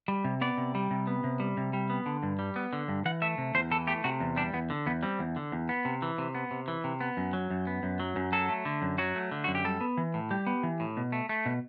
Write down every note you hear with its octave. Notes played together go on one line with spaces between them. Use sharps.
G3
C3
B3 D5
C3
G3
C3
B3
C3
G3
C3
G3
B3
D3
G2
G3
B3
D3
G2
E3 F#5
A3 E5
C3
E2 C5
E3 A4
A3 G4
C3 F#4
E2
G3 D4
E2 B3
D3
E2 B3
G3 C4
E2
D3
E2
B3
C3
E3
C3
B3
C3
E3
C3
B3
F#2
F#3
F#2
B3
F#2
F#3
F#2
F#3 A4
A3
D3
F#2
F#3 F#4
A3
D3
F#2 F#4
G4
G3 A4
B3
E3
A2
G3 G4
B3
E3
A2
B2
A3
A3
B2